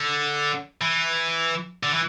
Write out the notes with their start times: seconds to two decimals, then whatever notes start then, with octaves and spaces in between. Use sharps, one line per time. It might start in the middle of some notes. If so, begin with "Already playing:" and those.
Already playing: D3
0.81 E3
1.83 D3
1.93 E3